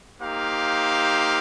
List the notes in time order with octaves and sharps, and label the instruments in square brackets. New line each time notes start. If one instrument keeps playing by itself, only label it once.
[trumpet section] A#3 D#4 G4 C5 F5